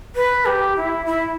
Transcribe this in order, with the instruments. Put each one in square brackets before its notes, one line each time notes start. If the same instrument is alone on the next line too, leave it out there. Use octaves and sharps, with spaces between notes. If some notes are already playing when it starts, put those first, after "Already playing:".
[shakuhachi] B4
G4
E4
E4